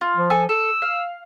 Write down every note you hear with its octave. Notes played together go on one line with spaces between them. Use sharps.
F4
F3
A4 G#5 E6
A4 E6
F5